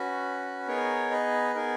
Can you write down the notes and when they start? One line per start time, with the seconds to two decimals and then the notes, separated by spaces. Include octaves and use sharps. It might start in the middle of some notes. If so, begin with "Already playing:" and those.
Already playing: C#4 F#4 B4
0.67 B3 D#4 G#4 A#4 C#5
1.11 B4 D#5
1.55 B3 D#4 G#4 A#4